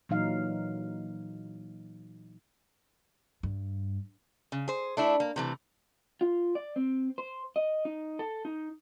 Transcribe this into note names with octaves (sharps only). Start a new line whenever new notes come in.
A#2 E3 F#3 D#4 F5
G2
C#3
G#4 C5
A3 D4 E4
A#3
C3 E3 A3
F4
D5
C4
C5
D#5
D#4
A4
D#4